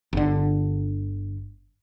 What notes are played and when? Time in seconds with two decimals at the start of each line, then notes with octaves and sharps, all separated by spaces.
0.13 G1 D3